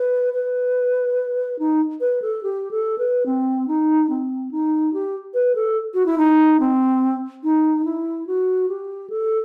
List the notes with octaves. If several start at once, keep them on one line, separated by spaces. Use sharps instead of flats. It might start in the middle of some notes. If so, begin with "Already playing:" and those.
Already playing: B4
B4
D#4
B4
A4
G4
A4
B4
C4
D#4
C4
D#4
G4
B4
A4
F#4
E4
D#4
C4
D#4
E4
F#4
G4
A4